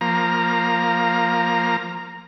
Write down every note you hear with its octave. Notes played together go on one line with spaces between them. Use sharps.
F3 A#3 A#5